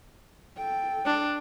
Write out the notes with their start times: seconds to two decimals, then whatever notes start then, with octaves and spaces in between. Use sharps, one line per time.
0.57 A4 G5
1.06 D4